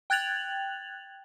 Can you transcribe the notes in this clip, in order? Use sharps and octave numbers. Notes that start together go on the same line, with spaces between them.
G5 F#6 G#6 A6 F7 F#7